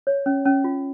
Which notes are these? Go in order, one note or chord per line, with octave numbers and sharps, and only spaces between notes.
C#5
C#4
C#4
F4